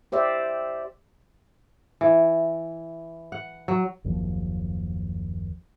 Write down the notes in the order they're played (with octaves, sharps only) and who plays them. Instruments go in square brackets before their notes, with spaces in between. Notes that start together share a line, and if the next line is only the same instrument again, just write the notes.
[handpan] G4 C5 D5 E5
[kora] E3
F#5
F#3
[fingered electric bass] F#1 D#2 F3